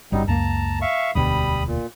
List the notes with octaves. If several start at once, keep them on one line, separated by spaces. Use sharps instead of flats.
G1 G2 F#3 G3 C#4 D#4
C#2 F#2 A#3 A5 A#5
E5 F5 C#6
E1 D2 B2 G3 B5 D#6
A#2